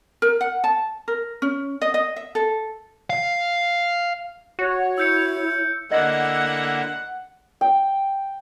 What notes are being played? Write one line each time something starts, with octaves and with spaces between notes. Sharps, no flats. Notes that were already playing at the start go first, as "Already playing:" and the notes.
A#4
F#5
A5
A#4
C#4
D#5
D#5
E5
A4
F5
F#4 C#5
E4 E6 G6 C#7
D3 A#3 E4 D#5 F#5 A#6
G5